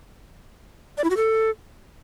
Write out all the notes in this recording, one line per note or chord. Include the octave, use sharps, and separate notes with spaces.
D5
E4
F#4
A4